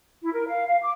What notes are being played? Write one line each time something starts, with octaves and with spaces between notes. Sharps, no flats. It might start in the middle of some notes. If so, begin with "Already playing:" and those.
E4
A#4
F5
F5
D6